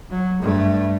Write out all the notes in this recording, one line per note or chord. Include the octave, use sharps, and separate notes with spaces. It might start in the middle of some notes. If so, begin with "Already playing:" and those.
F#3
G2 A3